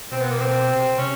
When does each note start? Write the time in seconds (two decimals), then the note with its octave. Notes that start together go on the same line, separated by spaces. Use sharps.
0.12 B2 C4
0.21 B3
0.31 A#3
0.41 B2 C4
0.69 C3
0.98 C3 C#4